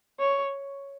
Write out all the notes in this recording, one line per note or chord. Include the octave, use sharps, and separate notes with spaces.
C#5